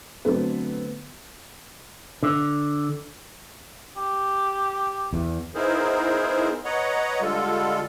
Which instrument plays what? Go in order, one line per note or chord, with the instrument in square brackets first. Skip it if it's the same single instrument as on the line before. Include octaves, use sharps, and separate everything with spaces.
[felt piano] D3 F#3 A3 B3 C4 B4
[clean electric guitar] D3
[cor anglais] G4
[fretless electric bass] E2
[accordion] B3 D#4 E4 G#4 A#4 C5
B4 C#5 D#5 F#5 A#5
D3 G3 G#3 F4 A4